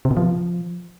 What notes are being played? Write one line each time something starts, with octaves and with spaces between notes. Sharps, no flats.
C3
B2
F3